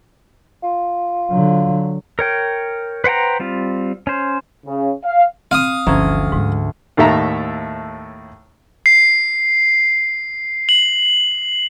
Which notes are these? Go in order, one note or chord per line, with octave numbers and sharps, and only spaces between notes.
F4
D3 F#3
A#4 C#5 G5
B4 C5 F#5 G5 A#5
G3 C4 F4
C#4 C5
C#3
F5
C4 F5 D#6
G1 D2 E3 F3 C#4 A#5 G#6
G#2 G#3 C#4
D#2 A2 A4 E5 A#5
C7
F#7